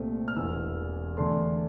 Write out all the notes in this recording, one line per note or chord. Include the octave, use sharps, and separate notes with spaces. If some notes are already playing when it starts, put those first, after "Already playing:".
Already playing: C2 A#2 A3 C4
F6
E1 E2 E3 E6
E2 D3 A3 D4 C6